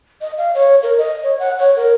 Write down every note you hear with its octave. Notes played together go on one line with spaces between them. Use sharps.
D#5
F5
C#5
A#4
D#5
C#5
F#5
C#5
A#4